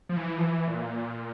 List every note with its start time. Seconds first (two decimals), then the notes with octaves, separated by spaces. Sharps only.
0.09 F3
0.17 E3
0.38 F3
0.42 E3
0.67 A#2